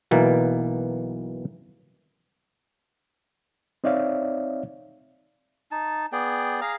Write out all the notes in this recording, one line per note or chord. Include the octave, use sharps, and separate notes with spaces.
B1 B2 E3 A#3
C4 D#4 C#5 D5 E5 F5
D#4 A5
B3 G#4 D5 G5
G#4 F5 A#5